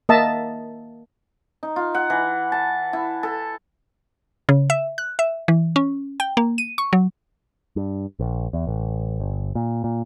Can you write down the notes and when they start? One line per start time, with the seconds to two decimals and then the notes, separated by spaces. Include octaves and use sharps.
0.09 A#3 D#5 E5 A5
1.63 D#4
1.76 F4
1.94 F#5
2.10 E3
2.52 A5
2.93 E4
3.23 A4
4.49 C#3
4.70 E5
4.98 F#6
5.19 E5
5.48 E3
5.76 C#4
6.20 G5
6.37 A#3
6.58 D#7
6.78 C#6
6.93 F#3
7.76 G2
8.19 A#1
8.53 E2
8.67 A1
9.20 G1
9.55 A#2
9.84 A#2